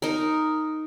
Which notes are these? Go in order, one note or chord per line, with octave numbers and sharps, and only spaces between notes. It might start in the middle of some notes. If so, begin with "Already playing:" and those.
D#4 A#4